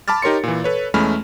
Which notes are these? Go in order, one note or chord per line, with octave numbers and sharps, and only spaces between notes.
A5 B5 D6 F6 A6
D#4 G4 A#4 C#5 C6 C#7
A#2 E3
A4 B4 C#5
E2 G#3 A3 C#4 B5 F6